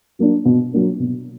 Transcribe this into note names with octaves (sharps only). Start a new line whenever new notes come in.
F#3 A#3 D4
B2
F#3 A#3 D4
B2